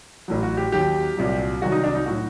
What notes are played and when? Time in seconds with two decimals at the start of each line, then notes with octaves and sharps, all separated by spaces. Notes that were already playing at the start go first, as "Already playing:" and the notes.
0.28 A1 A2 F#3
0.43 F#4
0.57 G4
0.72 D#2 D#3 F#3 G4
1.17 C2 A#2 F#3
1.61 C2 C3 D#3 F#3 F#4
1.72 D#4
1.84 D4
1.95 D#4
2.06 A2 F#3 F#4